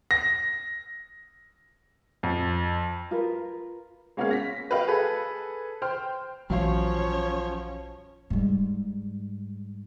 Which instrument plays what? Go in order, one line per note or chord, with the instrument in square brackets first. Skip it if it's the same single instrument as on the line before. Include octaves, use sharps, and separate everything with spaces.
[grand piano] A#6
F2
[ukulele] F4 A#4 B4
[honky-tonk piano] G#3 A#3 B3 C#4 G#4 F5
A#6 B6
F#4 B4 D#5 F5 G5
G#4 A4 B4
C5 G5 C6 F6
[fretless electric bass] A#1 E3 [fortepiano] F#2 F5 [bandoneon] F3 [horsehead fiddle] C#4 C#5
[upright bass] G#2 G3